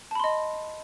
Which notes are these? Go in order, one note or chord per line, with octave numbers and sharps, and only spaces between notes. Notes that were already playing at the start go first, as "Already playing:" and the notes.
D#5 A5 B5 C6